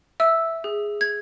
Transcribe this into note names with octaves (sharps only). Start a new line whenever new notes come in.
E5 E6
G#4
G#6